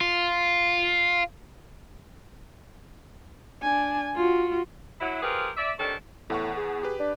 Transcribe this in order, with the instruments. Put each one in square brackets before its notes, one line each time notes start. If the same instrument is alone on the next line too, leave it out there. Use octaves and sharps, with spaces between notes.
[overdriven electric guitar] F4
[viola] D4 G#5
F4 F#4
[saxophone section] F#3 E4
C4 F4 G4 G#4 A#4 B4
D5 E5
C3 D#3 G3 C#4 D4 A4
[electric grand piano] E2 F#5 C#6 [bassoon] A2
[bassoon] G#4
[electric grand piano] G4 B4
[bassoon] D4